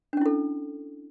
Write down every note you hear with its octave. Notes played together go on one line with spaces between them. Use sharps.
C#4 D4 E4 A4